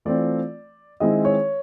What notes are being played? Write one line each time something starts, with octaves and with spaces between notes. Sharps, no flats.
E3 A3 C4 F4 D5
D#3 G#3 C4 E4 D#5
C#5